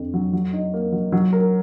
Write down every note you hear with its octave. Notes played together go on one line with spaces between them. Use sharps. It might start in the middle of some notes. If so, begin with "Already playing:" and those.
Already playing: F2 D3
F#3
F#3
D#4
A#3
F#3
F#3
A#4